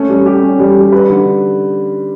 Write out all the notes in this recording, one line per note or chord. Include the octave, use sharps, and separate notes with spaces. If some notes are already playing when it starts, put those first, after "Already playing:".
Already playing: A3 C#4
G3
G4
C#4
G3
G3
B4
D3